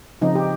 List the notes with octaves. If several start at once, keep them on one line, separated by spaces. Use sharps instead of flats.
C#3 F3 C4 D#4
G4